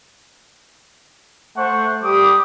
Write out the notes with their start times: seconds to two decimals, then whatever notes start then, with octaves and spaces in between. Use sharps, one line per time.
1.56 A3 C5 F#5 C#6
2.03 G3 G4 D6 D#6